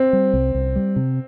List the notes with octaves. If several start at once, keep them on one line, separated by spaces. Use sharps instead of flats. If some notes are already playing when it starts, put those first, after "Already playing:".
Already playing: C4
G3
C2
C2
G3
C3